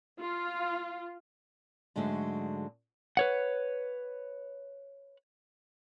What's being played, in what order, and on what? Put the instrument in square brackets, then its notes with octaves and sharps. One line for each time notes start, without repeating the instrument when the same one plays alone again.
[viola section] F4
[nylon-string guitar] G#2 D3 F#3 G#3 A3
[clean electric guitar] B4 C#5 F#5